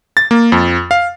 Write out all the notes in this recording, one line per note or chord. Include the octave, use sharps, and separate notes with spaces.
A6
A#3
F2
F5